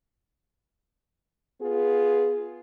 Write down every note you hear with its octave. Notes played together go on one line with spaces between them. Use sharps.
B3 F4 G#4